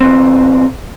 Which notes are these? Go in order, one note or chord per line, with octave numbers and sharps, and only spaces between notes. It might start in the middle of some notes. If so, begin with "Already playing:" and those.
E2 C4